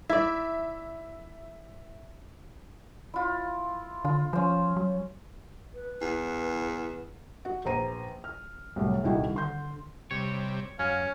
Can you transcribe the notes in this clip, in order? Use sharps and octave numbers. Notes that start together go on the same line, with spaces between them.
E4 D5 E5
E4 F4
D3 F4
F3 C#4 C5
F#3
B4
E2
F#4
A#1 B4 C5 A#5 D#7
F6
C2 A2 F#3
D#1 C2 D#3 E4 F#4 G5
D3 C6 G6
C3 G3 C#5
F#2 C#4 F5